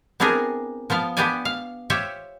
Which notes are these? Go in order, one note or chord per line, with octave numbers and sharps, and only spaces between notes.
B3 C4 D4 E4 G#4 A#4
F3 B3 F4 F5
B3 D4 G4 B4 D5 G#5
F5
F4 G4 C5 C#5 E5 G5